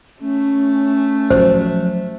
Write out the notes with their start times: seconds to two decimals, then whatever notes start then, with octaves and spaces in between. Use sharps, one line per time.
0.21 A3 C#4
1.30 F3 F#3 C5